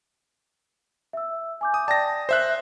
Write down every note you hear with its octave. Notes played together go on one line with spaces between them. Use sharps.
E5 E6
G#5 D6 G6
D#6
D5 G5 A5 A#6
C5 E5 F#6